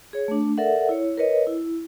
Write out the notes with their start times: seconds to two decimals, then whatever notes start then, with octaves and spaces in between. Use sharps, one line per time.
0.13 G#4 C#5
0.28 A3 D4
0.58 A4 A#4 D5 E5 F#5
0.89 E4 C#5
1.18 A#4 B4 C#5 D#5
1.47 E4